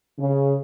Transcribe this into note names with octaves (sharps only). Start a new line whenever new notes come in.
C#3